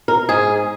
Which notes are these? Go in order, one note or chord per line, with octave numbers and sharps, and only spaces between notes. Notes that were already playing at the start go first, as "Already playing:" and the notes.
A#4
G#2 G#4